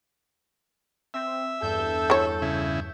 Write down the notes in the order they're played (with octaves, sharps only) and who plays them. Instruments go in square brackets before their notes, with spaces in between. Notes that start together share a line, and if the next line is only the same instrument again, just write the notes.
[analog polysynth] C4 [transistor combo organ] E5
[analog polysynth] E2 G2 G6 [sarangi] A4
[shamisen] E3 C#5
[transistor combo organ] C#3 E4